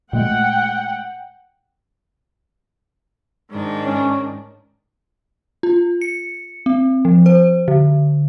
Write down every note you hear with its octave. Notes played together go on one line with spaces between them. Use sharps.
A#2 G#3 A3 F#5 G5
G#2 D#3 D4
C#4
F4
C#7
C4
F3
C5
D3